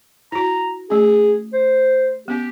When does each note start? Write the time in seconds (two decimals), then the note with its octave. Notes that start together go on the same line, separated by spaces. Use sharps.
0.32 E4 F#4 A#5
0.90 A3 C#4 G#4
1.53 C5
2.28 B3 C#4 G4